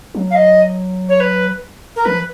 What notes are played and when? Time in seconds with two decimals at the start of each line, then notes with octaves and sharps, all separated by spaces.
0.15 F#3
0.31 F5
0.35 D#5
1.09 C#5
1.20 B4
1.96 A#4
2.05 F3 B4